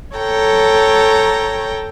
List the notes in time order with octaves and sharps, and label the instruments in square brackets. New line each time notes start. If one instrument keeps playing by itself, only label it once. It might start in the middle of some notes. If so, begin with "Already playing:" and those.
[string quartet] A4 C#5 G5 A#5